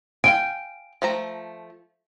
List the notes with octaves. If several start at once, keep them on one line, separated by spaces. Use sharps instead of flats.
F5 G5 G#5 D7
F3 A3 A#5